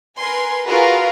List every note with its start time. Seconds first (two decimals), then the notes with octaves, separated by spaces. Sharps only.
0.18 A#4 B4 G#5 C6
0.67 F4 F#4 G#4 A#4 B4